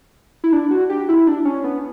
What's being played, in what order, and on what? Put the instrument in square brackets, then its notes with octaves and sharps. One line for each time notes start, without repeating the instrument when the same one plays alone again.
[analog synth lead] E4
D4
F#4
G4
E4
D4
C#4
B3